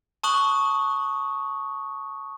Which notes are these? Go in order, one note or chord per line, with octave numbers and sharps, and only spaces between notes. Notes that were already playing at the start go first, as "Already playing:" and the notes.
A5 C#6 D#6 F#6 F#7